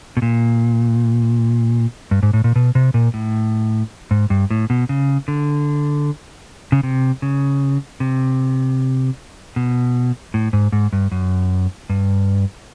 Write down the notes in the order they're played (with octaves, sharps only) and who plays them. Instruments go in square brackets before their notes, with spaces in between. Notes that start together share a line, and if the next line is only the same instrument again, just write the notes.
[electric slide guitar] B2
A#2
G2
G#2
A2
A#2
B2
C3
A#2
A2
G#2
G2
A2
B2
C#3
D3
C#3
C3
C#3
C3
B2
A2
G#2
G#2
G2
F#2
G2